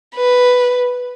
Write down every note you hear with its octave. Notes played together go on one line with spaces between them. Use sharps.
B4